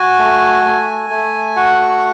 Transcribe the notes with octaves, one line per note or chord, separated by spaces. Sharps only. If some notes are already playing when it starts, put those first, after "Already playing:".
Already playing: F#4 G#5
A3
A3
A3
F#4 F#5